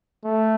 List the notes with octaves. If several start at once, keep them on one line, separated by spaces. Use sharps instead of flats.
A3